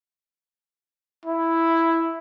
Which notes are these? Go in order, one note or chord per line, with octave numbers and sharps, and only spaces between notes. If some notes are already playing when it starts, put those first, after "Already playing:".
E4